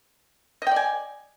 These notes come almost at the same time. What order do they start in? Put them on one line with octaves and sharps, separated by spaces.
D#5 G5 D5 G#5